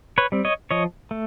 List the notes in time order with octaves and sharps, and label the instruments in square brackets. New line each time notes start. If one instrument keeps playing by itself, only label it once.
[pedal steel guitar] B4 C#5
G3 C4
C#5 D#5
F3 C#5 D#5
A3